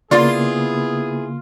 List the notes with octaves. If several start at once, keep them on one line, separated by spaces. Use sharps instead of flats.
C#3 A#3 B3 E4 F4 G#4 D5 C6